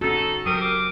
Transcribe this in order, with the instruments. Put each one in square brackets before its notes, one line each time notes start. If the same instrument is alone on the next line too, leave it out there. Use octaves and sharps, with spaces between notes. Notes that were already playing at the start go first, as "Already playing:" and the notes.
[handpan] C#4 F#4 [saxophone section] D#4 A4
[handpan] F#3 [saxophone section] C4 G4 A#4 [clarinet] D#6
[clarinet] D6